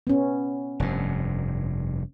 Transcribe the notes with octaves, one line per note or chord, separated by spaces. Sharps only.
B3 C#4
F1 G2